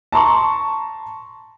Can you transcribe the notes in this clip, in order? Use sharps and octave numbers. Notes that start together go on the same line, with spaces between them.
A5 A#5 C6 C#6